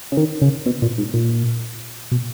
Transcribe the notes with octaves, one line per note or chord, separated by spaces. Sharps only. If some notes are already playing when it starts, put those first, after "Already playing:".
C#3
D#3
C#3
B2
A#2
G#2
A#2
B2